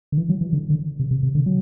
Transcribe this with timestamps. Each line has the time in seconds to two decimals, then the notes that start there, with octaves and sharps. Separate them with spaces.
0.12 D3
0.17 E3
0.29 F#3
0.41 E3
0.53 D3
0.70 D3
1.00 C3
1.11 C3
1.23 C3
1.35 D3
1.46 F#3